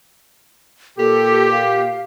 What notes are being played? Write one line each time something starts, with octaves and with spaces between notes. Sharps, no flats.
A#2 G4 A4
F5